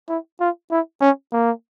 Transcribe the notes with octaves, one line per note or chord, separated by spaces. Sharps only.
E4
F4
E4
C#4
A#3